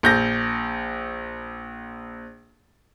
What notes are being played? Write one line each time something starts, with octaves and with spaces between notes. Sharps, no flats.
A#1 G6 A#6